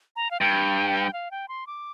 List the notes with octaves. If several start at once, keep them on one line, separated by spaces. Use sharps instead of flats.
A#5
F5
G2 G5
F5
G5
C6
D6